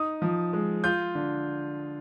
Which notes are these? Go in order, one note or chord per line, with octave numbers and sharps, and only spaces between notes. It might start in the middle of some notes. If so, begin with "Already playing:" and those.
Already playing: D#4 D#6
F3
G#3
F4 G6
D3